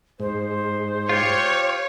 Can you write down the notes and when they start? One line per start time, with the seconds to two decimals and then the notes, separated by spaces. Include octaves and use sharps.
0.20 G#2 C5
1.09 F4 G4 C#5